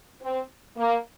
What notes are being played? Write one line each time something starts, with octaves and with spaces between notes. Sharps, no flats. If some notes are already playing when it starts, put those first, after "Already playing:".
C4
A#3